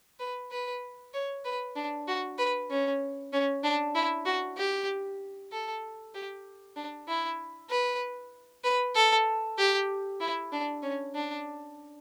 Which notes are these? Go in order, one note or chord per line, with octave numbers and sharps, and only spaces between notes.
B4
B4
C#5
B4
D4
F#4
B4
C#4
C#4
D4
E4
F#4
G4
A4
G4
D4
E4
B4
B4
A4
G4
E4
D4
C#4
D4